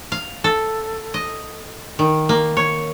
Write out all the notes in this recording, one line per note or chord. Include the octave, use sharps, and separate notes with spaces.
F5
A4
D#5
D#3
A#3
C#5